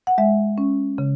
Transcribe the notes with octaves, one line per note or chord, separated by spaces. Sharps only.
F#5
G#3 E5
C#4
C#3